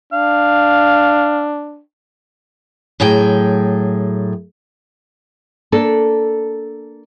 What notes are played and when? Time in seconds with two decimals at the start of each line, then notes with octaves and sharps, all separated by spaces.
0.13 D4 F5
3.00 A2 F#3 G#4 G5
5.72 A#3 D4 A4